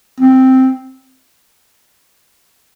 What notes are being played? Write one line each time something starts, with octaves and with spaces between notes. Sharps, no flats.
C4